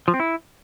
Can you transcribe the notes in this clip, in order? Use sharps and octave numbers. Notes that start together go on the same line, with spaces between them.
F3
C4
E4